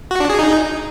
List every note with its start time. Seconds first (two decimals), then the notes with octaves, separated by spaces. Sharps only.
0.11 F#4
0.20 D4
0.30 G#4
0.39 D#4